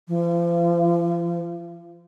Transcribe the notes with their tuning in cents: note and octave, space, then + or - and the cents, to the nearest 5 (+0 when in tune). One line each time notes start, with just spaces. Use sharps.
F3 -40